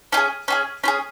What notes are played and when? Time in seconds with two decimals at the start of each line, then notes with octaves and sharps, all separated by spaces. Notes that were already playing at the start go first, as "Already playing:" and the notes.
0.12 C#4 F4
0.17 G#4
0.48 C#4 F4 G#4
0.84 C#4 F4 G#4